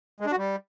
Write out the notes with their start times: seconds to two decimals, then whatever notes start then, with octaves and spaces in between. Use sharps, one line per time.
0.20 G#3
0.26 D4
0.32 F#4
0.37 G3